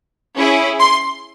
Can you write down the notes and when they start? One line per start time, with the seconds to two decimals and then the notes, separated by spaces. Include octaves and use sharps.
0.36 C#4 E4 G#4
0.80 C6